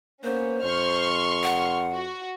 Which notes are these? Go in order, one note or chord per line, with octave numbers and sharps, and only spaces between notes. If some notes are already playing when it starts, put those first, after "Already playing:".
A#3 B3 C#4 C5
F2 C6 C#6 F6
F#5
F#4